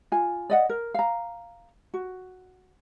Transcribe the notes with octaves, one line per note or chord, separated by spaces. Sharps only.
F4 G#5
D5 D#5 F#5
A#4
F5 A#5
F#4